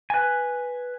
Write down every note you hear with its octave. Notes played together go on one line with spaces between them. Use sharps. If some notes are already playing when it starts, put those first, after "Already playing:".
B4 G#5